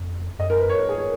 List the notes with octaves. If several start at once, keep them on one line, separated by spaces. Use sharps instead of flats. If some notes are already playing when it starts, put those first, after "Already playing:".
Already playing: F2
F#2 D#5
A#4
B4
C#5
A#4
G#4
C#5